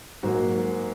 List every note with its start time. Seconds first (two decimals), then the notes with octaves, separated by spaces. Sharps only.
0.23 G#2 F#3 A#3 F#4